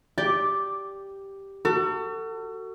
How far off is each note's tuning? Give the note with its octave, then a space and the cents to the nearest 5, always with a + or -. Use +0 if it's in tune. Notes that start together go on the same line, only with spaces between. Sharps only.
G4 +0 D5 -10
F#4 +20 A4 +35